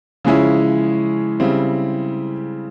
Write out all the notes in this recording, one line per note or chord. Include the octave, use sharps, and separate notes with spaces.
C#3 F3 G#3 C#4 E4
C#3 G3 C4 E4